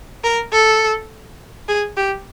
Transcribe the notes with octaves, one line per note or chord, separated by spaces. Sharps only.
A#4
A4
G#4
G4